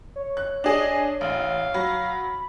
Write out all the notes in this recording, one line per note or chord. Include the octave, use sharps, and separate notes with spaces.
C#5
F#6
D4 G#4 D#5
A1 F5
F#3 B5